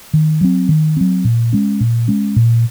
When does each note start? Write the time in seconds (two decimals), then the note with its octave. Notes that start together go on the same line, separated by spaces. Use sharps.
0.14 D#3
0.41 F#3 C4
0.69 D#3
0.97 F#3 C4
1.25 A#2
1.53 G#3 C#4
1.81 A#2
2.08 G#3 C#4
2.36 A#2